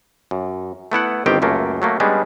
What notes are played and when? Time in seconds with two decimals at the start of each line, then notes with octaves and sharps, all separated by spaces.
0.31 F#2
0.92 A3 B3 E4 F#5
1.26 G1 D#3 C4 G4 G5
1.42 C#2 F#2 A3 A#3
1.82 F#3 A3 A#3
2.00 G3 G#3 B3 C#4 D4